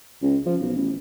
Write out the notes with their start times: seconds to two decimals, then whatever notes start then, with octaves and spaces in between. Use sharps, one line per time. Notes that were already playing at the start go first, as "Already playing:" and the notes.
0.22 C#2
0.46 F3
0.61 B1
0.76 A1